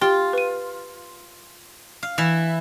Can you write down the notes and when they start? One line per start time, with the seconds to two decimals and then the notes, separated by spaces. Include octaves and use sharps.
0.01 F4 G4 G5 G7
0.33 B4 D#7
2.03 F5
2.18 E3 E4 F7